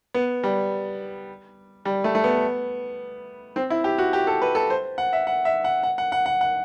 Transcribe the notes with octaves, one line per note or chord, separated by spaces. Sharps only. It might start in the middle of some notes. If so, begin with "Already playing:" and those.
B3
G3
G3
A3
A3
B3
C4
E4
G4
F#4
G4
A4
B4
A4
C5
F#5
E5
F#5
E5
F#5
F#5
F#5
F#5
F#5
F#5